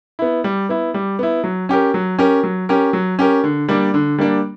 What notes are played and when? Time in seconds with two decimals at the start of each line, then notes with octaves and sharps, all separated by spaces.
0.19 B3 E4
0.44 G3
0.69 B3 E4
0.94 G3
1.19 B3 E4
1.44 F#3
1.69 C#4 G4 A#4
1.94 F#3
2.18 C#4 G4 A#4
2.43 F#3
2.69 C#4 G4 A#4
2.93 F#3
3.19 C#4 G4 A#4
3.44 D3
3.68 G3 A#3 D4
3.94 D3
4.18 G3 A#3 D4